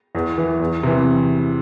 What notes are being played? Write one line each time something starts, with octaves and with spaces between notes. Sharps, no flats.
E2
E3
E2
C3 E3